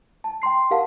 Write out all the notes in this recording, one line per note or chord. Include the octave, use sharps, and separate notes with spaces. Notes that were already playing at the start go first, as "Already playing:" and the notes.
A5
G5 A#5 C6 C7
G4 A#4 F5 F#5 A5